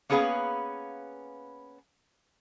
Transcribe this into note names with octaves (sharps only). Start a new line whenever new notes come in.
A#3 B3 C#4 G#4 B4 F5